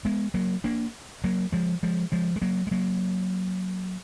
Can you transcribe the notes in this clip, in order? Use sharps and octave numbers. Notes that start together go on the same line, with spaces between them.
G#3 B3
F#3 A#3
A#3 D4
F#3 A#3
F3 G#3
F3 G#3
F3 G#3
G#3
F#3 A#3
G#3
F#3 A#3